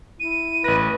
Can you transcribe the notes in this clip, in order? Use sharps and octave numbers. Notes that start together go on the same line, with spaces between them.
E4 D#7
A1 B4 A#6